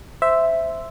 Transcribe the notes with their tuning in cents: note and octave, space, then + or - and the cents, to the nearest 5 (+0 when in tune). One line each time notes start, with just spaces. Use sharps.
C5 -10 E5 +0